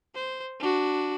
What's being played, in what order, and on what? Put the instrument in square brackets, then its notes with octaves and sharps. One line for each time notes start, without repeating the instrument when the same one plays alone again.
[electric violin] C5
D4 F#4